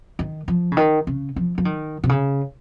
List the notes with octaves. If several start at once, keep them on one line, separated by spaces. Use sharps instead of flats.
D#3
F3
C#3
D#3
C#3
F3
F3
D#3
C3
C#3